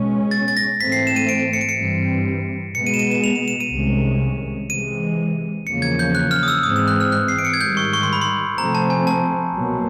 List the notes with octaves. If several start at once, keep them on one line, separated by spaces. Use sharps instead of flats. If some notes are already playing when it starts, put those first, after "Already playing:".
Already playing: B2 G#3 C#4
A6
A6
A#6
G#2 E3 A3 C4 B6
C7
E7
D#7
D7
C#7
D7
C#7
G2 E3 G3 C4
B2 G#3 B3 C#7
D#7
E7
D#7
E7
F7
E7
E7
D#7
C2 C3 D#3 G#3 C#4
C3 E3 G#3 D#7
E2 C#3 F3 A#3 C#4 C#7
G#6
G6
F#6
F6
D#6
E6
G#2 E3 G#3 C4 D#6
E6
F#6
F6
F#6
C7
D7
C#7
G#6
G#2 D#3 G3 G6
C#6
C#6
C6
B5
C6
C3 F3 A3 C4 A#5
A5
G#5
A5
C2 B2 F#3 A#3